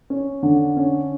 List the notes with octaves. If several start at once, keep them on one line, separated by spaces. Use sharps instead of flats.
C#4
D3
C#4